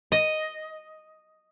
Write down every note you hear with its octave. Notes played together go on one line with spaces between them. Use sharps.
D#5